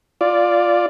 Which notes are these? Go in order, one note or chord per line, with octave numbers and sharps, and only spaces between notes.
F4 D5